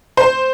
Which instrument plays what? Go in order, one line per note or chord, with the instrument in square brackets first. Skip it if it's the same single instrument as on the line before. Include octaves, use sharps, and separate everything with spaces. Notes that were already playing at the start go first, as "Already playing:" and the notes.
[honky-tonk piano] C5